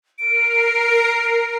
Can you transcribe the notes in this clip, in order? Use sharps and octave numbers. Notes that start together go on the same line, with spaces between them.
A#4 A#5 C7 D7